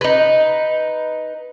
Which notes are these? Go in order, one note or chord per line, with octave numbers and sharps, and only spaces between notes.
D#4 B4